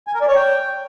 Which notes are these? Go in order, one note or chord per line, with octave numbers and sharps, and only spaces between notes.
G#5
A#4
D5
C#5
G5